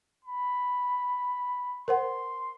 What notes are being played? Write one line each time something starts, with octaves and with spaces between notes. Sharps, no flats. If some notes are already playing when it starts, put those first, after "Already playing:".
B5
A#4 C5 F#5 C6